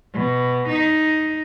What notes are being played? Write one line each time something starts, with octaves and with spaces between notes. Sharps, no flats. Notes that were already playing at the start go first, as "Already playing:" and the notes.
B2
D#4